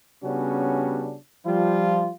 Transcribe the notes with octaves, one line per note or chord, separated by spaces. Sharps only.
C#3 G3 B3 C#4 D4 F#4
F3 G3 F4